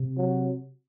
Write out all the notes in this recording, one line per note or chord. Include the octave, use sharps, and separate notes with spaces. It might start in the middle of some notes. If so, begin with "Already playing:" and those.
Already playing: C3
F#3